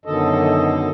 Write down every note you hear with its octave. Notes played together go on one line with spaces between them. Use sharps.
F#2 B2 D3 D#3 A4 D#5